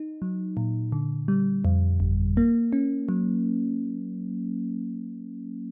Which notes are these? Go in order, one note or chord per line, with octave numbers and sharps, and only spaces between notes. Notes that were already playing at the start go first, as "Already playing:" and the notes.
Already playing: D#4
F#3
A#2
D3
G3
F2
G1
A#3
C#4
F#3